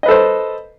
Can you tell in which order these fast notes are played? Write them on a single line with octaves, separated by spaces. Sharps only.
D#5 B4 A4 C5